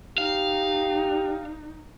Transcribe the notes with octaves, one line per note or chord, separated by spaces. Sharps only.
D#4 G4 F5